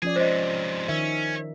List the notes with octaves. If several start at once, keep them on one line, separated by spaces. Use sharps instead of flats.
F3 C#4 G#4 D5
G#2 C3 C5 D#5
D#3 C#4 E5